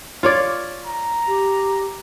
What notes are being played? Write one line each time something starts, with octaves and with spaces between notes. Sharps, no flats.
F4 C#5 D5
A#5
G4